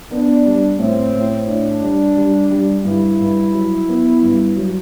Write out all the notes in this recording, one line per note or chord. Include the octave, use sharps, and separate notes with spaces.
B3 D4
G3
A2 C4
A2
A2 D4
G3
G3
G3
G2 E4
G2
F#3
B3
G2
F#3